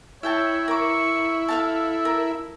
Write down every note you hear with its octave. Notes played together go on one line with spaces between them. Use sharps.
E4 C#5 E5 G5 A5
A#4 C#6 D6
A4 E5 F5 A5
A#4